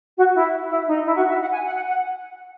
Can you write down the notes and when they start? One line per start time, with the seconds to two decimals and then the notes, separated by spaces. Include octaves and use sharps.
0.16 F#4
0.34 E4
0.70 E4
0.88 D#4
1.05 E4
1.17 F#4
1.29 E5
1.41 F#5
1.53 G#5
1.65 F#5
1.76 F#5
1.88 F#5